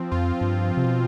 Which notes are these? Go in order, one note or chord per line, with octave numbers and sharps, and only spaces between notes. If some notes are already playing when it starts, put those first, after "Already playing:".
Already playing: F3 C4
F2 F4
G2 F3
F3
C3
B2